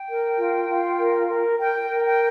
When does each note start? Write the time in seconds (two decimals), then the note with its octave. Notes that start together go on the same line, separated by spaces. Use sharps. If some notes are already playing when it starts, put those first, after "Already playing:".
Already playing: G5
0.09 A#4
0.38 F4
0.69 F4
0.98 A#4
1.29 A#4
1.59 A#4 G5
1.89 A#4
2.04 G5